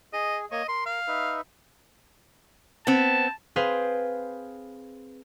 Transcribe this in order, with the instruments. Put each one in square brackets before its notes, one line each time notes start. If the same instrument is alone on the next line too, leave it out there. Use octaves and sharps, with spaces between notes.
[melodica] G#4 [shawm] D#5
[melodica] A#3 C#5 C#6 [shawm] D#5
[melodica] A#4 [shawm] C6
[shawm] F5
[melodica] D#4 B4 E5
[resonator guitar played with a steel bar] B3 C4 [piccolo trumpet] A5
[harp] C4 G#4 B4 C5 F5